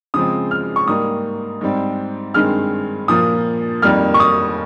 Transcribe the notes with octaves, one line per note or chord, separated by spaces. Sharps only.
C#3 F3 G#3 C4 D#6
F6
C#6
G#2 G3 A#3 D#6
G#2 G3 C4
G2 D#3 G#3 C4 F6
A#2 F3 A#3 D#6
F2 D#3 G3 A#3 F6
C#6
D#6